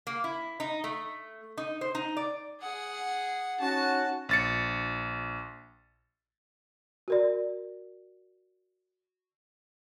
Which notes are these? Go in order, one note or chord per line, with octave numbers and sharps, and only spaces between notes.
A#3
E4
D#4
A3
D#4
C5
D#4
D5
G#4 F#5
C#4 D#4 F#4 A5
A#1 A6 C#7
F#4 A#4 D5